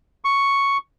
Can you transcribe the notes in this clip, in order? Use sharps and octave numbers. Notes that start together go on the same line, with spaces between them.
C#6